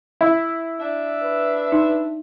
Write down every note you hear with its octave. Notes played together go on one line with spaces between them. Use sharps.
E4
D4 E5
B4
D#4